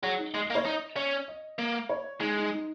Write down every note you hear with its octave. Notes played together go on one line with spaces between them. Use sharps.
F#3 G#4
D#4
G#3 D#5
D#5
A#3
C#5
D#4 D#5
C#4
D#5
A#3
C#5
G#3 D#4
D#4
D#4